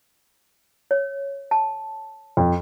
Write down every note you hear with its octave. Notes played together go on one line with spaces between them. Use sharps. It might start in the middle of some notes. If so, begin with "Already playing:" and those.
C#5
A5
F2